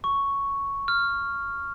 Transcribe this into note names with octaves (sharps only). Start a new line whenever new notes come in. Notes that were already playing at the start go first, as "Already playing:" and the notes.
C#6
F6